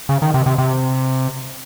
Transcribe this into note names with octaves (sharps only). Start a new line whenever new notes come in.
C#3
D#3
C3
C3
C3